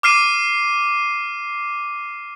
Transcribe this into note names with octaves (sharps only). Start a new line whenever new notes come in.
D6 F6 C7 D#7